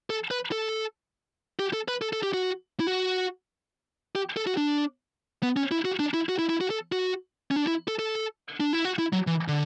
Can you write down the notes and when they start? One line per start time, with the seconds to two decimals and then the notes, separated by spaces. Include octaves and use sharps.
0.10 A4
0.31 B4
0.52 A4
1.59 G4
1.73 A4
1.88 B4
2.02 A4
2.13 A4
2.23 G4
2.34 F#4
2.80 E4
2.87 F#4
4.15 G4
4.37 A4
4.47 F#4
4.57 D4
5.43 B3
5.57 C#4
5.71 E4
5.85 F#4
6.00 D4
6.14 E4
6.29 F#4
6.39 E4
6.49 E4
6.61 F#4
6.70 A4
6.92 F#4
7.51 C#4
7.56 D4
7.67 E4
7.88 A4
7.99 A4
8.60 D4
8.73 E4
8.85 F#4
8.99 E4
9.13 F#3
9.27 E3
9.48 D3